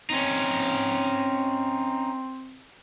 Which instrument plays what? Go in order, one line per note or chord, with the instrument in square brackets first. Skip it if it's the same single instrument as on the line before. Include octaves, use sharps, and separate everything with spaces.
[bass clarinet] C4 [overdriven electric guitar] C#4 D#4